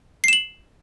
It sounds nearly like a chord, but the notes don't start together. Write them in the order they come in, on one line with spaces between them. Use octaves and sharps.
C7 E7 F#7